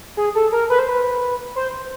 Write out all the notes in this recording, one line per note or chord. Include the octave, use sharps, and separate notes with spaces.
G#4
A4
A#4
B4
C5
B4
C5